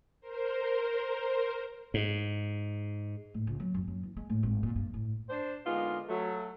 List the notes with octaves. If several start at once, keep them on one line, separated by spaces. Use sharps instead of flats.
A#4 C5
G#2
A2
C#2
F#3
F#2
F#2
E3
G#3
A2
G#1
A#2
G2
A2
D4 C5
D3 G#3 A#3 B3 D#4 F4
F#3 A3